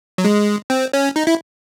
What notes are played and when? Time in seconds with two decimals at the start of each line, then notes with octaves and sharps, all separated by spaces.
0.18 F#3
0.24 G#3
0.70 C4
0.93 C#4
1.16 D#4
1.27 E4